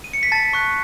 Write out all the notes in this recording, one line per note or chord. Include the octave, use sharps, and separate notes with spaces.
D#7
C#7
B6
A5 A6
C#6 F#6